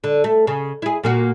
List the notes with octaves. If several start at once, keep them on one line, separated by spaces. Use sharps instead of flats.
D3
A3
C#3
E4 G#4
A#2 A#3 F#4